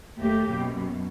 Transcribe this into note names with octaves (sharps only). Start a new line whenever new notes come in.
D#2 A3 A#3 G4
F#2 B2